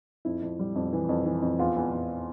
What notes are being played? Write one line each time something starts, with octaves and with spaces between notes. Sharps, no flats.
F2 E4
F2
G3
F2
E3
F2
E3
F2
E2 F4
E2
E2